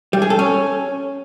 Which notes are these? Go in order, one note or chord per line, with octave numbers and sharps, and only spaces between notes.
G3
G#4
A4
C#4